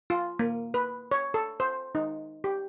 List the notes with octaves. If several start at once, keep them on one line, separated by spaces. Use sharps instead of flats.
F4
A#3
B4
C#5
A4
C5
D#4
G4